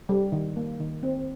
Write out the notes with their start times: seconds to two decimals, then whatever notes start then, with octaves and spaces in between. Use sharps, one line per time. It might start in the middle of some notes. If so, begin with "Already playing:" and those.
0.09 G3
0.32 D#3
0.56 A#3
0.80 D#3
1.03 C4